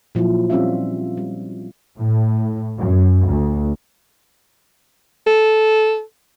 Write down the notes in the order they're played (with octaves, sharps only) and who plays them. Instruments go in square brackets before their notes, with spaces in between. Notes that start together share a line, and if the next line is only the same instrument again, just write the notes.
[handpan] A#2 F3 F#3 E4
G3 C4 C#4 F4 E5
G3
[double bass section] A2
F#2
D2
[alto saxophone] A4